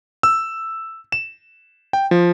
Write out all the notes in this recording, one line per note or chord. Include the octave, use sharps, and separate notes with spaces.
E6
E7
G5
F3